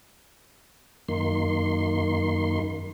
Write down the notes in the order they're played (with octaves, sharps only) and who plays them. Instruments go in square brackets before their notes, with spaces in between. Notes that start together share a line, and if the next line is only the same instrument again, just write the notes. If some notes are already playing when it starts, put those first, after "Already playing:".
[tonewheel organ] F#2 D#3 A#3 C6